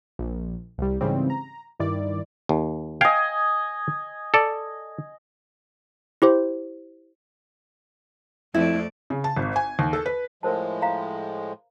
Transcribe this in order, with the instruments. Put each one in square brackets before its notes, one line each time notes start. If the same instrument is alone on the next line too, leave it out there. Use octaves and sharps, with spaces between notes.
[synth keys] A#1
C2 G3
G#2 C#3 E3 G3 C4
A#5
G2 D#3 E4 D5
[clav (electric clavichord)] D#2
[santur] D#5 G#5 [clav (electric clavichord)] F5 G5
[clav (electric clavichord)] A4 D5
[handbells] E4 G4 C5
[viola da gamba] F2 A3 D5 [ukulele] E4
[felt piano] C#3
A5
G#1
G#5
D#2
A4
B4
[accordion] A2 F3 G#3 [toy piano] A#4 C5 A5
[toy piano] F5 A#5